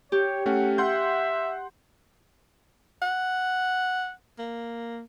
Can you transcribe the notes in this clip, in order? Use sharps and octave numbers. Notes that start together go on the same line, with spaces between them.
G4 C#5
A3 C#4 F#5
E5 F#5 C6 G6
F#5
A#3